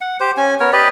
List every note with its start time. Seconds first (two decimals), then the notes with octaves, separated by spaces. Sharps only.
0.01 F#5
0.20 G4 C5
0.37 C#4 G#5
0.60 B3 A#4 C#5
0.73 G4 B4 D5 D#5